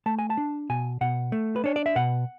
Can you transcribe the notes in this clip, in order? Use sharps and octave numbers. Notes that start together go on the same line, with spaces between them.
A3 A5
G#5
A5
D4
B2 G#5
B2 F#5
A3
B4
D4 C#5
D5
E5
B2 F#5